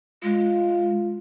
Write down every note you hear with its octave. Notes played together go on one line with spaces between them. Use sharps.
G#3 F4